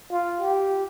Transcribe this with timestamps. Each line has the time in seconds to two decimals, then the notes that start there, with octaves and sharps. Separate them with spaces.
0.12 F4
0.41 G4